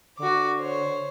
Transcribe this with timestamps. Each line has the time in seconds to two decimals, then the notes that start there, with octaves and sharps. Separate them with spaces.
0.19 D3 F#4 D6
0.59 C5 C#5